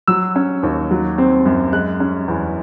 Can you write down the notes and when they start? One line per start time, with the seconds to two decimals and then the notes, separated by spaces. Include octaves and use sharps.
0.08 F#3 E6
0.36 C#4
0.63 D#2
0.91 F#3
1.18 C4
1.45 F#2
1.73 G#3 F#6
2.00 C#4
2.28 E2